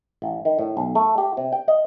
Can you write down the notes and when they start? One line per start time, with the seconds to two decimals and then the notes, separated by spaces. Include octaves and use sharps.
0.22 A1
0.45 D#3
0.59 A2
0.77 B1
0.95 A3
1.18 G4
1.37 C3
1.53 G5
1.68 D#5